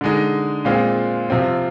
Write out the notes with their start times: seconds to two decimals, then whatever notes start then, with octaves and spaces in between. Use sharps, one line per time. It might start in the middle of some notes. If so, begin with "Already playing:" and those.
0.01 D3 G#3 D#4
0.65 A#2 G#3 C4 F4
1.30 C3 F3 C4 F4